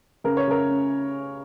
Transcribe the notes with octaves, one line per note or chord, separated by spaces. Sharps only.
C#3 A#4
C#5
C#3 A#4
C#4